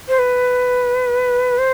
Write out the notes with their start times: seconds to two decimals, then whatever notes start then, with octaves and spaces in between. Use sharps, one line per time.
0.08 C5
0.18 B4
1.58 C5